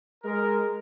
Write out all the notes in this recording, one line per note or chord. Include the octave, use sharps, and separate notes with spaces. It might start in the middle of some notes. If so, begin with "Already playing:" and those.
G#3 A#4